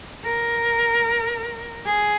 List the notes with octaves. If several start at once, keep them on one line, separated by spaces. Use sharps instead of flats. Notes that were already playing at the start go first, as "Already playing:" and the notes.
A#4
G#4